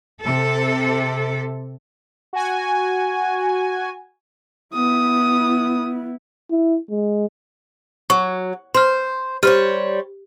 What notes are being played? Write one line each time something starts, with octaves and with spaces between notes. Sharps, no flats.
C3 A4
F#4 G#5
B3 E4 D#6
E4
G#3
F#3 C#6
C5 C6 F6
G3 G4 C5 C#5 F6